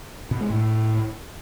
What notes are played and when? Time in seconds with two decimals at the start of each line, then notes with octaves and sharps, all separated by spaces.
0.31 B2
0.41 G#3
0.50 A2